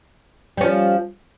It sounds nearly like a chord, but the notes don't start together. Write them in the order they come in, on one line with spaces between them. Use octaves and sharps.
G3 C#4 F3